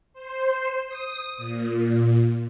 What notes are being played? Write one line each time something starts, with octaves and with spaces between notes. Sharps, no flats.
C5
D#6
A#2